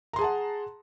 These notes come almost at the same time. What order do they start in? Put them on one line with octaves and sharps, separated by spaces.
A#5 C6 G#4 A5 F#5